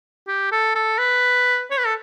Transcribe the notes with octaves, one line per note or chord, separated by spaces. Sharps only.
G4
A4
A4
B4
C#5
B4
A4